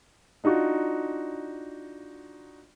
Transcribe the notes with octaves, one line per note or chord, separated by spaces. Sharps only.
D4 D#4 F4 F#4